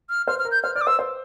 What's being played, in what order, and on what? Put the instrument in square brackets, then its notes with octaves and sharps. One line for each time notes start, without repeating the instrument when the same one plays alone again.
[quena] F6
[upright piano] C5 [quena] F6
[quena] F6
[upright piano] A#4
[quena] G6
[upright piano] C5 [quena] F6
[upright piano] D5 [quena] F6
[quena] D6
[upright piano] C5 [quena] E6
[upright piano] C5